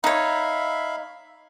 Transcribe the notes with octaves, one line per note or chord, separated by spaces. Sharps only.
D#4 C#5 E5 F5 B5